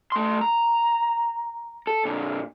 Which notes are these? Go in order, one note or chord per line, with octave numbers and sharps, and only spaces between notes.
A3 C6
A#5
A4
A#2 D3